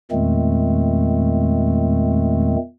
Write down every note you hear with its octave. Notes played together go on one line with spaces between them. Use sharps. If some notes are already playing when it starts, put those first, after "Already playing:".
E2 A#2 D#3 G#3 A3 C4